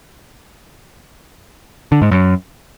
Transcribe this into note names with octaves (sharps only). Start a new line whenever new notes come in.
D3
G#2
F#2